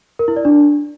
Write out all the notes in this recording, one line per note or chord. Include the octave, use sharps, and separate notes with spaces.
A#4
E4
D5
D4